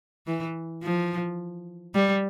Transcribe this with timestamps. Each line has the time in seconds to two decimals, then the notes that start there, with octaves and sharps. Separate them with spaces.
0.27 E3
0.83 F3
1.95 G3